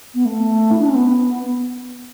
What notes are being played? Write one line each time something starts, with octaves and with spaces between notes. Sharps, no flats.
B3
A3
E4
D4
C#4
B3